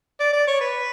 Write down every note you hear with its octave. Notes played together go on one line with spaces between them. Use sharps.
D5
D5
C#5
B4